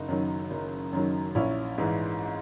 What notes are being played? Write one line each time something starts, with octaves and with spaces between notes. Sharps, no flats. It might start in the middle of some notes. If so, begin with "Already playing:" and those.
Already playing: F#1 D#4
F#2 D#3 F#3
F#1
F#2 D#3 F#3
A#1 C#4 E4
G#2 E3